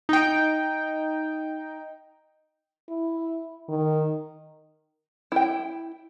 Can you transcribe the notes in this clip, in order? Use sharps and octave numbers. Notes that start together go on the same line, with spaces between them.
D#4 G5
E4
D#3
E4 G5